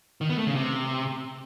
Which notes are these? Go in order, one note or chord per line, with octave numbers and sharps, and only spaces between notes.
D#3
B3
A3
C#3
C3